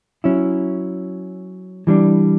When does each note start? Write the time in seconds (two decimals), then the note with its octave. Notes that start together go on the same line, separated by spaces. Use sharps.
0.24 F#3 C#4 E4
1.87 E3 G3 D4